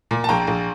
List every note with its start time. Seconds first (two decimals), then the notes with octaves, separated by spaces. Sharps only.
0.11 A#2
0.24 A5
0.29 A#1 G5 A#5
0.47 A#1